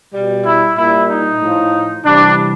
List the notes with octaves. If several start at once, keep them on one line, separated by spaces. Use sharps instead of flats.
B2 G3
E4
A#2 G3 E4
D#4
A2 F3
C3 E3 G3 D4